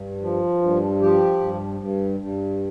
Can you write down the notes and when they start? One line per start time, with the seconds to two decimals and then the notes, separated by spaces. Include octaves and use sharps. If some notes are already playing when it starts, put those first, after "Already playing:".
Already playing: G2
0.22 F3
0.62 G2
1.01 F3 G4
1.41 G2
1.80 G2
2.20 G2